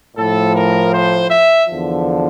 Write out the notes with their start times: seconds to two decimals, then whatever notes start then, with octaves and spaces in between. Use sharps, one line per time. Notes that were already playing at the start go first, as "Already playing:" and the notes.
0.17 A2 F3 A4
0.55 A#4
0.92 C5
1.30 E5
1.67 E2 D3 F3